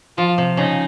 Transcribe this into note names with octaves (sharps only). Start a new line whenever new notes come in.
F3 F4
C3
C#3 D#4